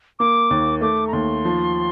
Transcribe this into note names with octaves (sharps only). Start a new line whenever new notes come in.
A#3 D6
D#2
A3 D6
A#5
D#2 C6
F3